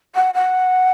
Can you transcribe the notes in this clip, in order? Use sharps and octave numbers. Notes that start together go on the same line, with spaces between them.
F#5
F#5